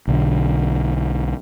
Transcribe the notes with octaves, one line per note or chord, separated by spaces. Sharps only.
B1 D3